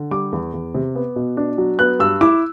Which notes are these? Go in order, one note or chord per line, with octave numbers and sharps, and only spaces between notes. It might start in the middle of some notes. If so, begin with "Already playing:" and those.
Already playing: D3
G3 D6
E2
E2
C3
B3
B2
D4
F#3
B3 F#6
G2 E6
E4 D6